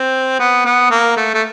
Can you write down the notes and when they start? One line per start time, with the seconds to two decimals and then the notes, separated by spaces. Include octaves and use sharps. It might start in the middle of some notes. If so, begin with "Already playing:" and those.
Already playing: C4
0.39 B3
0.65 B3
0.91 A#3
1.17 A3
1.34 A3